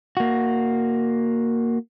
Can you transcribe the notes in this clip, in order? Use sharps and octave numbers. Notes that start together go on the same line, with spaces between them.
A#3 F#4